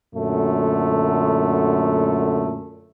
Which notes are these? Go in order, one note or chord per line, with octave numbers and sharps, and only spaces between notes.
F#2 A#2 D3 A3